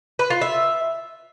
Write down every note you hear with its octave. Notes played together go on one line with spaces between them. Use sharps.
B4
F4
E5